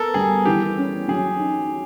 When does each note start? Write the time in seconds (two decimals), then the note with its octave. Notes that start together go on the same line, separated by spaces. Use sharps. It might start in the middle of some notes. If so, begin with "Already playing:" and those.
Already playing: B3 A4 A#4
0.14 G3 G#4
0.45 E3 G4
0.78 C#4
1.08 F#3 G#4
1.39 D#4